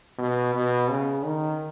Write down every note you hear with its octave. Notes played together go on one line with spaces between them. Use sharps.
B2
B2
C#3
D#3